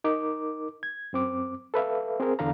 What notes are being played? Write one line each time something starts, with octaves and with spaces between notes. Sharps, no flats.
D#4 A#4 D6
G#6
F#2 C4 D6
A4 B4 E5 F5
C4 G#4 A#4
E2 D3 D4 F5 A#5